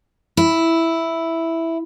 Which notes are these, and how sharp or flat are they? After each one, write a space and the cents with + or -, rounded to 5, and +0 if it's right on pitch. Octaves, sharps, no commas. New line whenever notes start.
E4 +0